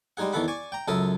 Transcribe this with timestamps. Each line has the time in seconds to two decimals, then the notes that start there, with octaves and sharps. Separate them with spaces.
0.17 G3 G#3 D#4 G#4 F#5
0.33 E2 D#3 E3 A4 F#5 B5
0.48 D5 G#5 C#6
0.72 G5 A#5
0.88 C#2 F#2 A4 A#4 E5 D#6